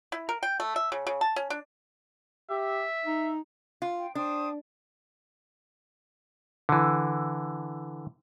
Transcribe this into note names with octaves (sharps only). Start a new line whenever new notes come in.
E4
A#4
G5
A3
E5
C#3
C#3
A5
C#4
D4
G4 E5
D#4
F4
G5
D4 C5 G5 D#6
D3 E3